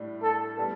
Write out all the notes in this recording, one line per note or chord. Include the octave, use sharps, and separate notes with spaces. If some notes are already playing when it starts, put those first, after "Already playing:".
Already playing: A2 G3 D4
A4
G3 B3